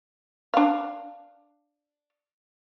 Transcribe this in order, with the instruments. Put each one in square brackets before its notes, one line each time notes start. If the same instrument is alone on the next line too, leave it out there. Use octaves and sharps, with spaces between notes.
[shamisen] D4 F5